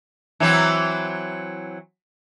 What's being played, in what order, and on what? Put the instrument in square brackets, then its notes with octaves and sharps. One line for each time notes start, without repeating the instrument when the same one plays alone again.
[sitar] E3 F#3 C4